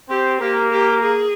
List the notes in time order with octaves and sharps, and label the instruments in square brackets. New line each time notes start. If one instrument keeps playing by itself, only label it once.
[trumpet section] C4 C5 [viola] G4
[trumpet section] A#3 A#4 [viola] G4
[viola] G4
G#4